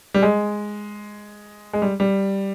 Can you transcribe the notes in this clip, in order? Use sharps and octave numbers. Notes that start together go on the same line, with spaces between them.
G3
G#3
G#3
G3
G3